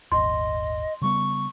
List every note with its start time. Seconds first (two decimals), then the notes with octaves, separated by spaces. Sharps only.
0.12 D#1 G#1 D#5 C6
1.02 C#3 G3 B3 C#6